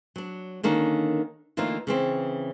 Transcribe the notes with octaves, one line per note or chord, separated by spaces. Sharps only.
F#3 D4
D3 D#3 A#3 C#4 D4
D3 E3 A3 A#3 D#4 F4
C#3 E3 C4